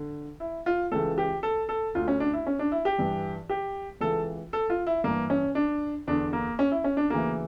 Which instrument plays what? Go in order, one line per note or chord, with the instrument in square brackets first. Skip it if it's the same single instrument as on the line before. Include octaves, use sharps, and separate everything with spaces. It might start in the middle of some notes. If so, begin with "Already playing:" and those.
Already playing: [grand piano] D3
E4
F4
C#2 C#3 E3 A4
G4
A4
A4
D2 D3 F4
C#4
D4
E4
C#4
D4
E4
G4
G2 E3
G4
C#2 C#3 E3 A4
A4
F4
E4
G2 E3 A#3
C#4
D4
E2 D3 D4
A#3
C#4
E4
C#4
D4
D2 C#3 E3 A#3